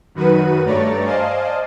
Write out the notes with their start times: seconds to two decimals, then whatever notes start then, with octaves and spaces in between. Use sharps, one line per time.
0.15 F#2 D#3 F#4 B4 D#7
0.65 G2 A3 C#5 D5 A#5 A6
1.05 C5 D5 D#5 F5 G#5 A5